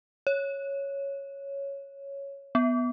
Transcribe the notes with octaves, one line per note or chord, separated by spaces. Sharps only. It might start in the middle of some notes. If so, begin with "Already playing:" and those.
C#5
B3